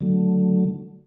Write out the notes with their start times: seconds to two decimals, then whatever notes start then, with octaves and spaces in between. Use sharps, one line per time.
0.01 D3 F#3 A3